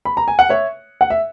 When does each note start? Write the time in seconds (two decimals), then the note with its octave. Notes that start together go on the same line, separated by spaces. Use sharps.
0.05 B5
0.17 A#5
0.28 G#5
0.39 F#5
0.49 C#5 E5
1.01 F#5
1.10 E5